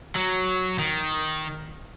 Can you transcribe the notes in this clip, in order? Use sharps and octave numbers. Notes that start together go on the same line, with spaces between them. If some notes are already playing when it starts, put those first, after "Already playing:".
F#3
D#3